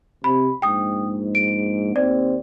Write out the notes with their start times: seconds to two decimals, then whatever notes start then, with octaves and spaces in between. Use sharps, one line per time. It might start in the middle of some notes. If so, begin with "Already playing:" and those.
0.24 C3 B5
0.62 A#1 G#2 G5 D#6
1.35 D7
1.96 D#2 C4 D5